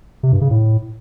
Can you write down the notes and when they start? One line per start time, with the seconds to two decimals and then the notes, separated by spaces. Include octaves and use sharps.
0.23 C3
0.32 G2
0.41 C#3
0.50 A2